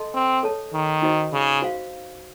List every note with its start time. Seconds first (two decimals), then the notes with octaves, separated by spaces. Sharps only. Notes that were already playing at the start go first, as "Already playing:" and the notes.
Already playing: A4 D#5 A5 C6
0.14 C4
0.43 A4 C#5 A5
0.74 D#3
1.02 D#4 F#4 C5 D#5
1.33 C#3
1.62 F#4 C5 F5